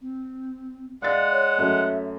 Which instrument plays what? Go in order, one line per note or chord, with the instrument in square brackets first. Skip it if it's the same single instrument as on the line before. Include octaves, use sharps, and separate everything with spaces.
[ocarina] C4
[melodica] G#3 F#5 [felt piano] D5 F5 A6
[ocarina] C#5
[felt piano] F#2 A3 [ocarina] E5